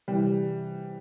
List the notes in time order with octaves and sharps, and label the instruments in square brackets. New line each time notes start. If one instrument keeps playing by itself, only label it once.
[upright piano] C3 E3 G3